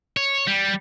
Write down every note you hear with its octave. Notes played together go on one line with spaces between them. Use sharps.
C#5
G3